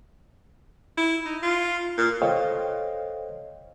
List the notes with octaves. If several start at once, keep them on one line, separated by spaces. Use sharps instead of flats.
E4
D#4
F4
A#2
A4 C5 C#5 D#5 F5 G5